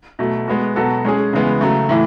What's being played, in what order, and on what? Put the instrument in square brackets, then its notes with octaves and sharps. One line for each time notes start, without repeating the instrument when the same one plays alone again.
[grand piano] B2 F#3 A3
G#3 B3 F#4
B2 F#3 B3 F#4 A4
G#3 C#4 G#4
C#3 E3 G#3 B3
C#3 F#3 A3
A2 E3